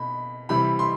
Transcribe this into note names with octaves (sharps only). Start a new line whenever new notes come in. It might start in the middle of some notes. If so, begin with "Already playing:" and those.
Already playing: B2 B5
C3 E3 G3 B5
C6